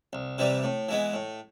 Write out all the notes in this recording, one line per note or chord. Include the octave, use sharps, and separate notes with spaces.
C2
C3 E3 G3
A2
E3 G#3 B3
A2